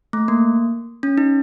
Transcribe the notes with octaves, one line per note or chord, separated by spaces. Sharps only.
A3
A#3
C#4
D#4